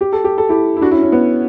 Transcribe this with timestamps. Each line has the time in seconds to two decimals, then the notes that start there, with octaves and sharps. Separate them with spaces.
0.01 G4
0.13 A4
0.24 G4
0.38 A4
0.49 E4 G4
0.77 E4
0.81 D4 F#4
0.91 C#4 E4
1.02 C#4
1.12 B3